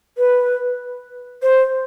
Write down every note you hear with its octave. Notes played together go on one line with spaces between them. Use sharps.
B4
C5